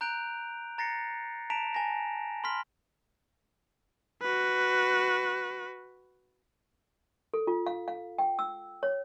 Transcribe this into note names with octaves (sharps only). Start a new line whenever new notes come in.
A#5 F#6 G6 D7 F7
A#5 A6 A#6 C7 C#7
A5 A#5 B6 D7 E7 F7
G#5 A5 A#6
B5 C6 F6 B6
F#4 B4
A4
F4
F5
F5
G5
E6
C#5